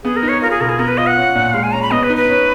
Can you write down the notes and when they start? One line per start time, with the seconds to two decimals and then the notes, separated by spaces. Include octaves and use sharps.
0.04 B3 G#4
0.16 A#4
0.23 D#4
0.28 C#5
0.42 F4 A#4
0.50 G#4
0.60 B2 A#4
0.69 G#4
0.79 B3 A#4
0.88 B4
0.97 F4 D#5
1.07 F#5
1.17 C#4
1.35 A#2
1.54 G#3 F5
1.63 G#5
1.72 C#4 A#5
1.82 B5
1.91 B3 D#5
2.03 B4
2.09 D#4
2.16 B4
2.29 C#4